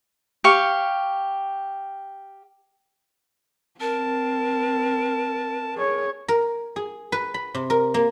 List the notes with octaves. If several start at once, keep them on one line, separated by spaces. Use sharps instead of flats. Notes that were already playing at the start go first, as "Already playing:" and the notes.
G4 F5 C#6
C4 A#4 A5
G#4 C#5
A#4
G#4
B4
B5
C3
A#4
A#3